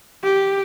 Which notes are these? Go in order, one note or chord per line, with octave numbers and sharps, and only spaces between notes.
G4